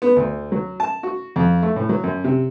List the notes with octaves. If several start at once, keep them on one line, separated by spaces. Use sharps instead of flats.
B3
D2
F#3
A5
F#4
F2
A3
A2
F#3
F#2
C3